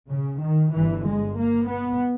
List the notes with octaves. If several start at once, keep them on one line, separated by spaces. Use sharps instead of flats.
C#3
D#3
G1 G2 E3
G#3
A#3
B3